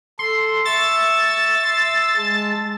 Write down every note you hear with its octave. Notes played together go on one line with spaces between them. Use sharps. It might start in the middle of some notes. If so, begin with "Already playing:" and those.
A4 C6
E5 C#6 E6 A6
C6 E6
G#3 A5